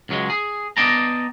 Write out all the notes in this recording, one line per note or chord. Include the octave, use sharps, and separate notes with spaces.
C#2 F#3 G#3
G#4
B3 D5 D#5 G5 A5 A#5